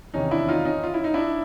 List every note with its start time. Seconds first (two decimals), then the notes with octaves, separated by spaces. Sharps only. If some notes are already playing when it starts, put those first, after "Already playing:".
0.14 E2 C3 D#3 C#4 D#4
0.31 D4 E4
0.48 D#4 F4
0.65 C#4 D#4
0.83 F4
0.94 E4
1.04 D#4
1.14 D4 E4